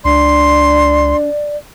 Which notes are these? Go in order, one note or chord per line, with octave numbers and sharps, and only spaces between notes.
C#2 D4 D5 C6